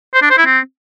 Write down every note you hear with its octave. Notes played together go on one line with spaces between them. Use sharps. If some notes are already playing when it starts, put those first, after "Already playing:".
C5
D4
C5
E4
C4